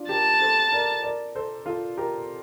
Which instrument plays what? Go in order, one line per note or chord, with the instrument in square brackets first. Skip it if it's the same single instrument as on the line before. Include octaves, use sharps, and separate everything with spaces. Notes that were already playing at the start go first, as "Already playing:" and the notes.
Already playing: [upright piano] D4 F4
[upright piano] G4 A#4 [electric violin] A5
[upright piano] A4 C5
A#4 D5
A#4 D5
A4 C5
F4 A4
G4 A#4